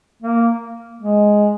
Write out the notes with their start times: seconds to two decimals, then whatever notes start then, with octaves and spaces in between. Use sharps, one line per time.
0.23 A#3
1.01 G#3